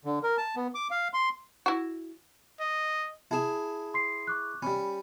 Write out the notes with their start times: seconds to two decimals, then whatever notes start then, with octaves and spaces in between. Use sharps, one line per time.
0.05 D3
0.23 A#4
0.38 A5
0.56 B3
0.75 D6
0.91 F5
1.13 C6
1.66 E4 F#4
2.61 D#5
3.31 E4 G#4 A5 E7
3.94 C6 C7
4.27 C#6 D6 F#6
4.63 G3 C#4 B5